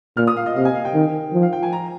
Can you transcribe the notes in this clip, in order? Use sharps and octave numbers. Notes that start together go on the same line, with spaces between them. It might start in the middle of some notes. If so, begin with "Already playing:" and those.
A#2 F6
D#6
F5
D#5
C3 F5
G#5
F5
G5
D#3
F3
F5
G5
G#5
A#5